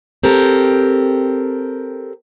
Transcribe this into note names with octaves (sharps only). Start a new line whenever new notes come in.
C4 G4 A4 A#4